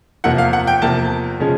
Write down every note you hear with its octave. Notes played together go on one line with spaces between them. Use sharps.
E2 C3 F3 A#3 F#5
F5
F#5
G5
E2 C3 F3 A#3 A5
C#3 F3 G#3 C#4